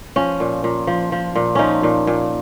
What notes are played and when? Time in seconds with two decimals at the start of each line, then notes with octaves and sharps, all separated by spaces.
0.16 F3 C#4
0.40 A#2
0.64 A#2
0.87 F3
1.12 F3
1.35 A#2
1.55 F3 C#4 D#4
1.83 A#2
2.07 A#2